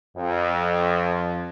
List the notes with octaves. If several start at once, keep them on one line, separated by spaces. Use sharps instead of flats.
F2